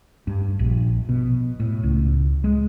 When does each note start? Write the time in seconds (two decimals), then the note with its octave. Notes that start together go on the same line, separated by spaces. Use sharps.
0.27 G2
0.59 A#1
1.09 B2
1.60 A2
1.83 C#2
2.44 G#3